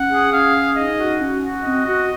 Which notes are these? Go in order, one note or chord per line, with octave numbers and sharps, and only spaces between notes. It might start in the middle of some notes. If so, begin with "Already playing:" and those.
Already playing: C#4 F#5
G#4
C#4 F5
G#4
D#4 D#5
F#4
C#4
F#4
C4 D#5
F#4